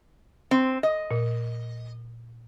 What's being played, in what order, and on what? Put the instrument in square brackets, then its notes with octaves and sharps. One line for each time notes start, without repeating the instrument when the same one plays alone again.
[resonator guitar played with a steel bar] C4
D#5
[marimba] A#2